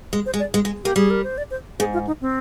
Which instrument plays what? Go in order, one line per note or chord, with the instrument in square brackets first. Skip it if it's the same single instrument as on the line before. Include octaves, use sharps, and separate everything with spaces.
[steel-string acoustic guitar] G#3
[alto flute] C5
[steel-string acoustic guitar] G#3
[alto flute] D5
[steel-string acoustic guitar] G#3
G#3
[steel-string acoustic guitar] A#3 [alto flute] G4
[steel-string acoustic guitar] G3 [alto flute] G#4
[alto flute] A#4
C5
D5
C5
[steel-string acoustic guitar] G#2 [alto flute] G#4
[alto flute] F4
D#4
C4